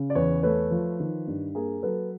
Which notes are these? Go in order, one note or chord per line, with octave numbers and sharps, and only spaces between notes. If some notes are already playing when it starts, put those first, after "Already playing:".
Already playing: C#3
D5
E2 B4 C#5
A3 B4 C#5
F3
D#3
G2
A#3 G#4 A#4
F#3 A4 B4